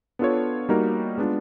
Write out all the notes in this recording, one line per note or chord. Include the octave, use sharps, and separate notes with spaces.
B3 D4 F4 A4 C#5
G3 A#3 D#4 F#4 A#4
G#3 B3 D4 F4